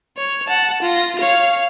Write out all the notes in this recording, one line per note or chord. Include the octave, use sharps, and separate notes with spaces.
C#5
F#5 A5
F4 A#6
C#5 F5